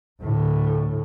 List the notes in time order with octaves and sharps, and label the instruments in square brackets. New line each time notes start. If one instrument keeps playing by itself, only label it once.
[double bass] D2 A2